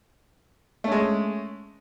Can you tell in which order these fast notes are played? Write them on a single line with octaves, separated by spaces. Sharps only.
A3 C#4 G#3